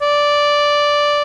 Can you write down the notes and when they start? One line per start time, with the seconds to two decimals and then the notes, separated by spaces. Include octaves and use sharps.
0.02 D5